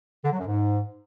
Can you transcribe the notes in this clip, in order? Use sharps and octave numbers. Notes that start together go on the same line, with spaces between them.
D3
F#3
F#2
G#2